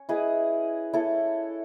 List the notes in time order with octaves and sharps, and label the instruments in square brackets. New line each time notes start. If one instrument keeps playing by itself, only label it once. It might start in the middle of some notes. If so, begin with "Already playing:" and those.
Already playing: [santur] C#4
E4 G#4 B4 D#5
E4 A4 C#5